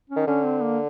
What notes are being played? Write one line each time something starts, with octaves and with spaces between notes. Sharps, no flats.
C#4
D#3
D3 C#4
C4
A#3